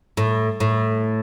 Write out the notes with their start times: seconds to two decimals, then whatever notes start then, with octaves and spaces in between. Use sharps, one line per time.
0.17 A2
0.60 A2